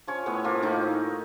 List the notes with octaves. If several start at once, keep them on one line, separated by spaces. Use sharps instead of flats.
F3 C#4 C#5
A2 B3 B4
F3 A#3 F4
A2 D#3 D#4